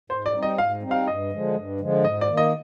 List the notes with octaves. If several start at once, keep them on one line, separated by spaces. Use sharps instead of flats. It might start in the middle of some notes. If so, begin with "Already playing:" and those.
G#2 C5
D5
G3 C4 D#4
D#5
G#2 F5
G3 C4 D#4
F5
G2 D#5
D3 F3 G#3
G2
D3 F3 G#3
G#2 D#5
D5
D#3 A#3
D#5